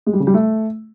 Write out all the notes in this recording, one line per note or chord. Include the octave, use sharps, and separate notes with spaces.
G#3
G3
C#3
G3
A3